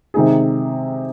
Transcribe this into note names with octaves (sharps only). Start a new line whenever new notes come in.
C3 D#3 G#3 D#4 G#4